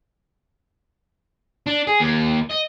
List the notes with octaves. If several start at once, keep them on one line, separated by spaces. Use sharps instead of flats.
D4
G#4
D#2
D#5